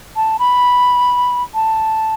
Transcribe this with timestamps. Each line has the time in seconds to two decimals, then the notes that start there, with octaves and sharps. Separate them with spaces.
0.16 A5
0.39 B5
1.54 A5